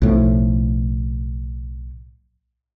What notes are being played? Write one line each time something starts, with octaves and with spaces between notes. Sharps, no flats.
B1 A2 F3